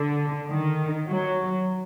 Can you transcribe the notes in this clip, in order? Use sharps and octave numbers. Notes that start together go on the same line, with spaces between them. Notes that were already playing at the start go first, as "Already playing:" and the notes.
Already playing: D3
D#3
F#3